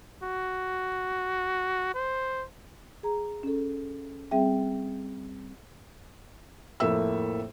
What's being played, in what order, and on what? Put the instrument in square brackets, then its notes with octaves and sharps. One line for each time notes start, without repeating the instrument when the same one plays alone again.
[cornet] F#4
C5
[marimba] G#4 A#5
C#4 A4
G3 C4 G#4 E5 G5
[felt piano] F2 A2 A#3 A4 E5 E6